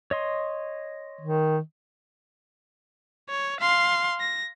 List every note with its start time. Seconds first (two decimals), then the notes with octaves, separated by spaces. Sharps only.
0.11 C#5 D#5 C6
1.21 D#3
3.29 C#5
3.60 F5 C6
4.20 A#6